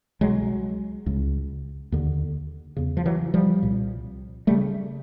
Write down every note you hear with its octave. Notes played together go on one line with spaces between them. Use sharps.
C2 B2 F#3 G#3
C#2 C#3
D#2 D3
E2 C#3
F3
E3 F#3
F3 G3
C2 A#2
G3 A3
C#3